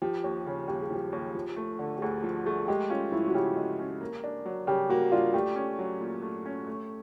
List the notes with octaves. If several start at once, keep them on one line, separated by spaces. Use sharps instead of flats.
F3 G4
D#2
C#3
D#2 G4
G#4
F3 G4
D#2
F3
A3
D3
G4
D2 G#4
F3
A3 G#4
G#3 G4
C#4 F4
F3 E4
F#4
C#3 G4
G#3
C#4
A#3
D4
F#3
C#3 G4
A#3 F#4
D4 F4
A3 G4
C#4
F#3
A#2
A3
C#4
A3